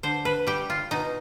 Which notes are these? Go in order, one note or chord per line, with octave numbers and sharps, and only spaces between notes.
D3 C5
B4
G3 G4
F4
B2 D#4